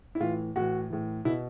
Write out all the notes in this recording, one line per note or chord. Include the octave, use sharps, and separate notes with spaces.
E4
A2 E3 F4
A2 E3 F#4
A2 E3
B2 E4